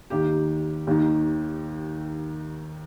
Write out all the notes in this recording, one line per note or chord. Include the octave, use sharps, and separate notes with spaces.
D#2 D#3 G4
D#2 D#3